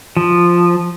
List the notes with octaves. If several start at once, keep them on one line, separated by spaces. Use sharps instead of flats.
F3